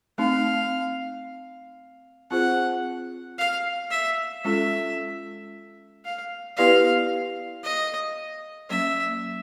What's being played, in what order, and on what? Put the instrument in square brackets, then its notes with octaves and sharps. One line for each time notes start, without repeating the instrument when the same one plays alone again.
[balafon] A3 C4 D#4 [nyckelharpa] F5
[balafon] C4 F4 G#4 C5 [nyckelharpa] F#5
[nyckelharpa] F5
E5
[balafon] G#3 C#4 F4 A4 [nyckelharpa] E5
[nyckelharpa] F5
[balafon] B3 E4 G4 B4 D5 [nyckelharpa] F5
[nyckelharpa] D#5
[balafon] F#3 A#3 C#4 [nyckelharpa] E5